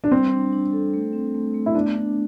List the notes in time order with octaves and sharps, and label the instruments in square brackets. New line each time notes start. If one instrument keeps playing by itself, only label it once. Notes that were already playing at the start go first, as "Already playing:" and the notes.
[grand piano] D4
[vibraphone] G3 [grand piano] C4
[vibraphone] D4
D4
A4
A3
C4
A3
A3
[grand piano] E4
[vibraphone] B3 [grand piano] D4
[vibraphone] D4